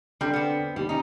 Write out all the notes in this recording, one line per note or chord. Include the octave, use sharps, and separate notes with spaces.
D3 G3 C4 G5 G6
B3 C4
D#2 G3 G4
C#4 D#4